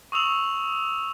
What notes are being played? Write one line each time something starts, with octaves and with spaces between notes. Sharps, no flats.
C#6 D#6 E6 F7 F#7